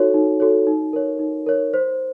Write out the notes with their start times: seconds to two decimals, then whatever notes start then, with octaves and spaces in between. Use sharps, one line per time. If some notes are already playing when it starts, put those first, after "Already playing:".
Already playing: D#4 F#4 A4 C#5
0.14 D#4
0.40 F#4 A4 C#5
0.67 D#4
0.93 A#4 C#5
1.19 D#4
1.46 A#4 C#5
1.74 C5